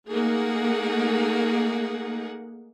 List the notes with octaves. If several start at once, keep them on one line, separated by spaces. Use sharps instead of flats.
A3 A#3 D#4 G#4 F#5